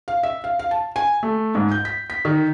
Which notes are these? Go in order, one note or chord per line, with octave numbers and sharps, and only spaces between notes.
F5
E5
F5
F5
A5
G#5
A3
G#2
G6
B6
B6
D#3